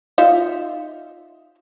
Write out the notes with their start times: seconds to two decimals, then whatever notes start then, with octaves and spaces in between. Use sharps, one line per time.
0.18 D#4 F4 E5